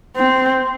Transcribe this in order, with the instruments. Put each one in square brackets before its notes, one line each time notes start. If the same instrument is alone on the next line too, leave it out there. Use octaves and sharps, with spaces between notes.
[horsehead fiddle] C4